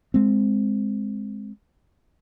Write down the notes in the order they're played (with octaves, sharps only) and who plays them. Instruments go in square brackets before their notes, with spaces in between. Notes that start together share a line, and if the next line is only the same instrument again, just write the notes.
[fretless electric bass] G#3 C4